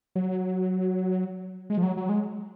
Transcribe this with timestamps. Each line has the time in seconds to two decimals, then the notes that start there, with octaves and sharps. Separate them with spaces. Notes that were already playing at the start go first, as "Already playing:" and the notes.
0.16 F#3
1.70 G#3
1.77 F3
1.83 F#3
1.97 F#3
2.09 G#3